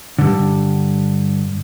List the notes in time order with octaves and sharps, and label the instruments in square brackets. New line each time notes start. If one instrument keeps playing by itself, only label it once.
[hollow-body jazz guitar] G2 D3